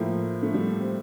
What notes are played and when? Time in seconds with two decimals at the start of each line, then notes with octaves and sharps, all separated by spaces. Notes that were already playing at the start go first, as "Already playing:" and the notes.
Already playing: A2 F3 A#3
0.43 A3
0.54 G3
0.80 C4